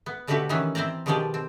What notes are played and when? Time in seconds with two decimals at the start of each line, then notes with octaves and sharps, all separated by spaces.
0.06 B3
0.27 B2 D3 A3 F#4 G4 B4
0.49 D#3 E3 B3 C#4 E4
0.75 C4 E4 C5 D5 A#5
1.06 B2 D#3 F3 G4 G#4 D5
1.34 C4